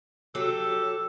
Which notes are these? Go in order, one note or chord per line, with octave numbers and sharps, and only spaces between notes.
F#3 G4 A4